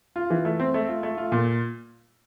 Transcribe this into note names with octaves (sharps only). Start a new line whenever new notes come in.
F4
E3
A3
C4
A3
F4
A3
F4
A#2